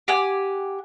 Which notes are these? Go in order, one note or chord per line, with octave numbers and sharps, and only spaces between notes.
G4 F#5 G#5